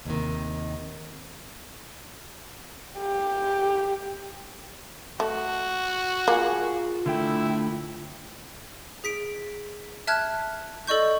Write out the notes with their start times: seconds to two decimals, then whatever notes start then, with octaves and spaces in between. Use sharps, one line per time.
0.05 D#2 C3 D#3
3.00 G4
5.20 A3 F#4
6.28 A#3 F4 G#4 G#5
7.06 D3 A3 E4 G5
9.04 G#4 B6 D7
10.07 E5 A5 F6 F#6 G#6
10.87 A4 D5 D#5 C#6 G6